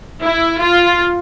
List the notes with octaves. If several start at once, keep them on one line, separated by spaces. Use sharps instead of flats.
E4
F4